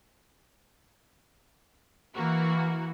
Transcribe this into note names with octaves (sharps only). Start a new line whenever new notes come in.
E3 A#3 E4 F#4 A#4